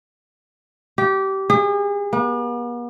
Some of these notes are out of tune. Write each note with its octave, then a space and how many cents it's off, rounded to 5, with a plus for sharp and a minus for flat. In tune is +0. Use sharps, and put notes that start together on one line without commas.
G4 -20
G#4 -40
B3 -45